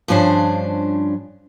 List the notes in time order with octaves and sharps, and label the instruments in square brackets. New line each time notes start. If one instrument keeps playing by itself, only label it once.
[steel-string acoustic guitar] G2 F3 C#4 D4 C5